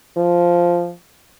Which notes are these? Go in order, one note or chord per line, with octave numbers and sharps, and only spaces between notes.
F3